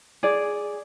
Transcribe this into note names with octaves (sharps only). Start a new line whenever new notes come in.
G#4 D5